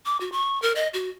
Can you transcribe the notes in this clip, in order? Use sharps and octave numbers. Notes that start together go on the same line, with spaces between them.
D6
F#4
C#6
A#4
D#5
F#4